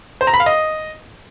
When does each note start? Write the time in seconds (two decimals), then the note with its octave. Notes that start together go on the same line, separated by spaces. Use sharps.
0.21 C5
0.27 A#5
0.34 B5
0.40 F5
0.46 D#5